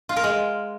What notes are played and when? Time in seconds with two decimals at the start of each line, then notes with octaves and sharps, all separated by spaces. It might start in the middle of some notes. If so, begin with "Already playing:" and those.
0.09 F4
0.16 A#4
0.24 G#3